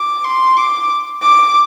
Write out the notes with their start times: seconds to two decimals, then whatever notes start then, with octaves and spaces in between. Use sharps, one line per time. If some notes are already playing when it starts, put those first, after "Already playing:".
Already playing: D6
0.24 C6
0.57 D6
1.21 D6